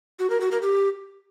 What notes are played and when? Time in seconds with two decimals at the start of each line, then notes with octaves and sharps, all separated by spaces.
0.19 F#4
0.30 A#4
0.41 F#4
0.51 A#4
0.62 G4